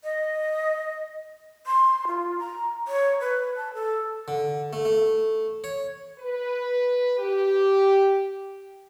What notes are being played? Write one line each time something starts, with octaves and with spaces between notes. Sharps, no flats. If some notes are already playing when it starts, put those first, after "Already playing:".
D#5
C6
F4
A#5
C#5
B4
A5
A4
D3
A3
A3
C#5
B4
G4